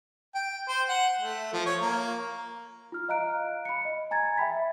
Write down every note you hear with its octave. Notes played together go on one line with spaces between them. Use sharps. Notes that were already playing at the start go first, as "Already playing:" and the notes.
G5
C5
F#5
A3
F3
C#5
A#3
F4 F6
D#5 F5 A#5 F#6 D7
B5 C#7
D#5
G#5 A#5 G#6 A6
E5 G5 B5 B6